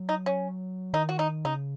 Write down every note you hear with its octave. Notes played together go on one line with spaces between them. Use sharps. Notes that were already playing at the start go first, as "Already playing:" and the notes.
Already playing: F#3
D#4
C#4
D#3 D#4
F#4
D#4
C#3 D#4